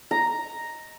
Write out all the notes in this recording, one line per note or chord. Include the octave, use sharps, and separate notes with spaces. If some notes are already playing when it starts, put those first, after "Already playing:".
A#5